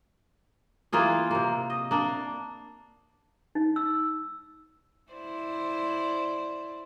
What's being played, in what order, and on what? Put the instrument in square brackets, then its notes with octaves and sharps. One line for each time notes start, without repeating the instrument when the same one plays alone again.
[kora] E3 A#3 F4 G#4
C3 A#3
D#5
A#3 D4
[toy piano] D#4
E6
[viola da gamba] E4 C5 D5